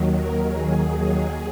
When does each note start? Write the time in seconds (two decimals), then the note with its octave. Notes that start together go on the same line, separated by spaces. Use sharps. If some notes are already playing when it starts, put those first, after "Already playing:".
Already playing: D#2 D#3 F#3
0.16 A#4
0.47 G#4